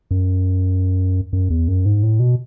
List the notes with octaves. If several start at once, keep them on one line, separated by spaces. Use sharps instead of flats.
F#2
F#2
E2
F#2
G#2
A2
B2